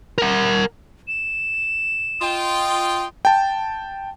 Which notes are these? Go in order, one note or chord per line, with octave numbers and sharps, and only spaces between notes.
A#4 F#5
E7
F4 D#5 G5
G5 A5